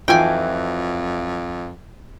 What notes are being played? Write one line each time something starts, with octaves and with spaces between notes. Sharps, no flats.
F2 E3 F#3 A3 D#4 F4 G5 G#5